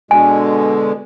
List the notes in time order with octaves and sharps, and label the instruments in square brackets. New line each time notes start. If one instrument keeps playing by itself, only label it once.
[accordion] B2 D3 G#3 [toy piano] G#5